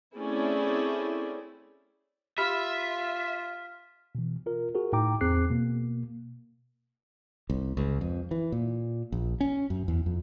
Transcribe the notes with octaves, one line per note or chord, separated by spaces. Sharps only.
A3 C4 C#4 E4 G#4 D5
F4 G4 E5 B5 C6 F6 B6
B2 E3
F4 A#4
F#4 G#4 A#4
A2 D#4 G5 A#5 D6
E2 C4 G#4 D6 F#6 C7
B2 A#3
C2
C#2
F2
E3
A#2
A#1
C#4
F#2
E2
F2